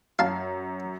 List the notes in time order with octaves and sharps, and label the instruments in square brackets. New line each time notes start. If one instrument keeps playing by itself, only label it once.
[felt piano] F#2 [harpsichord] F5 A5